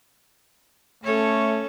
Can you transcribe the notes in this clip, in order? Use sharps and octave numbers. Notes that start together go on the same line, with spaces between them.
A3 C#4 A4 C#5